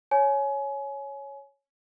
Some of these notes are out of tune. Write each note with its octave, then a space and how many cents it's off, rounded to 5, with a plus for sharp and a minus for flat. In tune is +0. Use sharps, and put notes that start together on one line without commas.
C#5 +0 G#5 +25